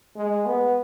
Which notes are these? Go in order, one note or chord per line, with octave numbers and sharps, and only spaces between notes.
G#3
B3